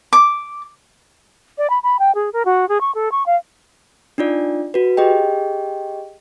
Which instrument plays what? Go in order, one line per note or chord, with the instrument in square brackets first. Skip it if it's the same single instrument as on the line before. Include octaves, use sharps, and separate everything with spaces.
[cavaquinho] D6
[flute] D5
B5
B5
G5
G#4
A#4
F#4
G#4
C#6
A4
C#6
F5
[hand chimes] D4 D#4 F4 D5
F#4 B4
G4 G#4 D#5 G5